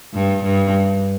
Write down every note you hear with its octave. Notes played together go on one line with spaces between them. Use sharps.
G2
G2